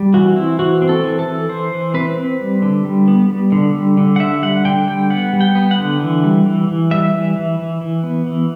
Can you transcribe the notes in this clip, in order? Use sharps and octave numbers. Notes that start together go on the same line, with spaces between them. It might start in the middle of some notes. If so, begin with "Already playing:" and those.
Already playing: G3
E3 F#4
C4 E4
E3 F#4
C4
A4
E3
A4
E3
E3 C5
E3
C4 B4
C4
G3
D3
G3
B3
G3
D3
G3
D3
F#5
D3 E5
G3 F#5
D3 G5
G3 G5
B3 F#5
G3
G5
B3
F#5
D3
E3
G3
E3
E3
G3 E5
E3
E3
E3
E3
B3
E3